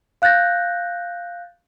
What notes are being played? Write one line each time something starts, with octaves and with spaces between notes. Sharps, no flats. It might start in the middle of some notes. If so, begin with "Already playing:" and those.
F5 F#6 G6 A6 A#6